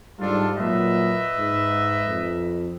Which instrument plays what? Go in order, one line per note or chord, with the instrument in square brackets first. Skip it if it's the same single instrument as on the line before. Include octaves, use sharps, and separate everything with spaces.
[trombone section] G#2 G3 [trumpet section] D4 F4 A4
[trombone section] A#2 F#3 [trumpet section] B4 D#5 E5
[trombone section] G#2
F2